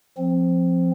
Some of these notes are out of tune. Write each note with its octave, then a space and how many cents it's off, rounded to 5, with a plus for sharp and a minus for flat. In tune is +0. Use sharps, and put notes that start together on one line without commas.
F3 +0 C4 +0